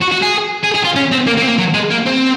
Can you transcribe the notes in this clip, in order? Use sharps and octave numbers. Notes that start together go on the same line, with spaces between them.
F#4
F#4
G#4
G#4
G#4
F4
C#4
C4
A#3
A#3
C4
A#3
F#3
G#3
A#3
C4